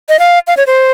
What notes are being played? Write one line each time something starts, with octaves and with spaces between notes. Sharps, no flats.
D#5
F5
F5
C#5
C5